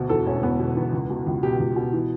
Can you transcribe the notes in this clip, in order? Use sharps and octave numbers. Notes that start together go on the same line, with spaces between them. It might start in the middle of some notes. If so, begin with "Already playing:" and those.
Already playing: D2 B2
E2 A4
E1 C#4
E1 B3
B2
E2
C#2
B2
C#2
B2 G4
C#2
B2
E3